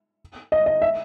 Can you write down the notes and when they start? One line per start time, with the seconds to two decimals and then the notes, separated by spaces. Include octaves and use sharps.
0.52 D#5
0.66 D#5
0.82 E5